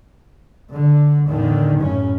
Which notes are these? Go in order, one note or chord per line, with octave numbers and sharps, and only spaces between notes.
D3
E2 A2 D3 D#3
F#2 A2 C#3 C#4